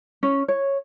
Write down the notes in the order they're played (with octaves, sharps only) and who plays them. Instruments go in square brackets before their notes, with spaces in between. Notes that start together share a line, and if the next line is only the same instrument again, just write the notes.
[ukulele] C#4
C#5